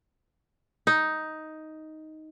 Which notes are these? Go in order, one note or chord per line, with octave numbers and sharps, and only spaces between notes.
D#4